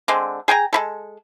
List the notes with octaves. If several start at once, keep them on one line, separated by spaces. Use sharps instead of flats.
D3 G#3 C4
G#4 G5 G#5 A#5
G#3 E4 A4